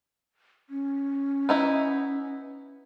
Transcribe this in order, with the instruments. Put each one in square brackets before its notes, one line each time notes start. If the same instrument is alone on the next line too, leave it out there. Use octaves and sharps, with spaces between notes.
[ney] C#4
[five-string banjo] B3 D#4 E4